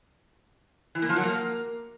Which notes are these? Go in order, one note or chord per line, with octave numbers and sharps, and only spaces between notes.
E3
A#3
F3
F#3
A#3